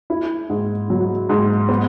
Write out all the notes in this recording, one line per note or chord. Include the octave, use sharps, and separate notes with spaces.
E4
G#2
F#3
G#2
B3